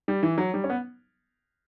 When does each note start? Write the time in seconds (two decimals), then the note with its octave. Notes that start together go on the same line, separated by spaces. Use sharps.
0.08 G3
0.23 E3
0.38 F#3
0.54 G3
0.64 C#4
0.70 B3